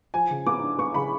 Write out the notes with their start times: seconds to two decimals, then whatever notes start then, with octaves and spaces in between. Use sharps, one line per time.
0.14 F3 G#5
0.30 C#3
0.46 B3 D6
0.62 D4
0.78 B3 C#6
0.94 C#3 B5